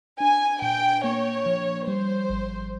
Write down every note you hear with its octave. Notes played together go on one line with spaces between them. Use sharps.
D4 G#5
A#2 G5
A#3 C#5
F3
G3 C5
G#1